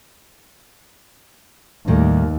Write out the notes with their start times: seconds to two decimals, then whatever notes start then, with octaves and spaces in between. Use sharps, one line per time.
1.88 D#2 A2 D#3 G3